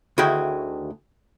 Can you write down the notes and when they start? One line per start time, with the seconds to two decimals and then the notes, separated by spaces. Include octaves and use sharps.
0.18 D2 D#3 E4 F#4 G#4 G5